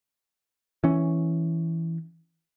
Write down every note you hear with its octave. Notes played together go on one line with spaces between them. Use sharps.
E3 C#4